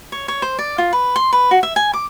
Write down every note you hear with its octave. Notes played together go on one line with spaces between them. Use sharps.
C#5
C#5
C5
D5
F4
B4
C6
B4
F#4
E5
G#5
D6